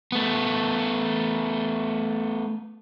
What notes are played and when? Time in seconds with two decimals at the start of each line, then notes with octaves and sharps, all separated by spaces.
0.12 A3 B3